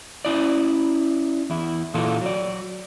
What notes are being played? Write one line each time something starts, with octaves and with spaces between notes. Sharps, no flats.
C#4 E4 D5
E2 E4
A#2 E3 F4 F#4 A4
F#3 D5